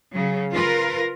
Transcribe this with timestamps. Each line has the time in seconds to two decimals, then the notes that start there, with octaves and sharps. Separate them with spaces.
0.13 C#3 F#3
0.52 F4 A#4 B4